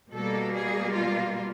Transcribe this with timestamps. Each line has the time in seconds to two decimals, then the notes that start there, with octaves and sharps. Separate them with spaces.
0.13 B2 G3 A#3 A4
0.54 G#4
0.95 F4